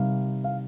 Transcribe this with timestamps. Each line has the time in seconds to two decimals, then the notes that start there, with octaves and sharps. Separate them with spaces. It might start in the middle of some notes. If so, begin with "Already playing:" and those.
Already playing: C3 D#3 G3 F5
0.44 F5